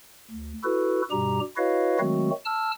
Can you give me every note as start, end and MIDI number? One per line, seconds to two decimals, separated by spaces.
0.31 0.53 38
0.64 1.02 64
0.64 1.02 66
0.64 1.02 69
0.64 1.02 71
1.11 1.40 43
1.11 1.40 47
1.11 1.40 55
1.11 1.40 67
1.11 1.40 82
1.57 1.98 64
1.57 1.98 66
1.57 1.98 71
1.57 1.98 73
1.57 1.98 75
1.57 1.98 77
1.99 2.30 51
1.99 2.30 54
1.99 2.30 56
1.99 2.30 57
1.99 2.30 60
1.99 2.30 66
2.45 2.71 81
2.45 2.71 88
2.45 2.71 89